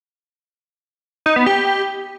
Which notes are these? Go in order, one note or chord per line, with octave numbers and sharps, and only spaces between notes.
D#4
B3
G4